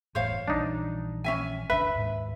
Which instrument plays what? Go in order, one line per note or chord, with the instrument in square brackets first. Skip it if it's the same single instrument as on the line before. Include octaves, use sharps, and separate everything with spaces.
[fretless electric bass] F#1 E2 A2 [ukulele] C5 C#5 F5
[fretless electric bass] A#1 E3 G3 [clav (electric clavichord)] D4 D#4
[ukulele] C#4 E5 G#5
[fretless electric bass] F#1 C#2 D4 [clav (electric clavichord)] B4 [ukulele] E5
[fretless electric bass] D#2 G#2